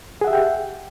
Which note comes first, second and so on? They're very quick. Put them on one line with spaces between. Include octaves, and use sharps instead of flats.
G#4 F#5 E5 G4 G5